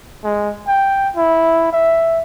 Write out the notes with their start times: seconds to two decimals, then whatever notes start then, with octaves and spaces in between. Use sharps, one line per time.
0.24 G#3
0.67 G5
1.15 E4
1.73 E5